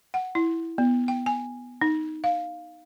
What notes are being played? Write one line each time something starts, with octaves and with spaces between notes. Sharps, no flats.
F#5
E4
B3
G5
G#5
D#4
F5